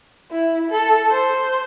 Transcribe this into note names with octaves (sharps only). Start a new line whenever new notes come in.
E4
A4
C5